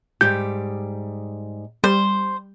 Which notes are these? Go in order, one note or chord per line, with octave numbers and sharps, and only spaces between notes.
G#2 G3 G4 G6
G3 C5